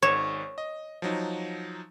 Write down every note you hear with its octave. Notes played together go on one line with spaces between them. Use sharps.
G#1 G#2 C#5 E7
D#5
F3 F#3 D#4